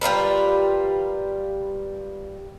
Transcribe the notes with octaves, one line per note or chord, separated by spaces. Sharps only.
G3 F4 A#4 B4